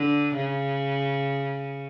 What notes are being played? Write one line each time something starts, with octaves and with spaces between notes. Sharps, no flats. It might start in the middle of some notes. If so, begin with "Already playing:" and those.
Already playing: D3
C#3